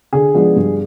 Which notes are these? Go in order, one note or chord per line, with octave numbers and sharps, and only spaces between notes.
D3 G#4
F3 G#3 B3 D4
G2